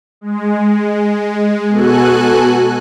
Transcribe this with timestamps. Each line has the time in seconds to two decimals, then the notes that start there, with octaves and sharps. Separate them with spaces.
0.21 G#3
1.69 B2 F#4 A4 G#5 F#6